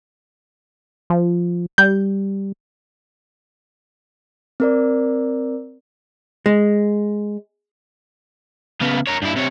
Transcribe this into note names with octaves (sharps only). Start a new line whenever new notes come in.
F3
G3 G6
C4 A#4 D5
G#3
C#3 B3
A#4 C#5
G2 E4
C3 C#5